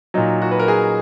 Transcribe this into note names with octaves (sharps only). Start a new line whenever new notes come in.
A#2 F#3 D#4
F#4
B4
A#4
G#4